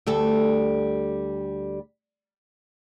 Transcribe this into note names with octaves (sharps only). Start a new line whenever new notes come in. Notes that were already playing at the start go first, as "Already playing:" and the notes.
D2 G3 A4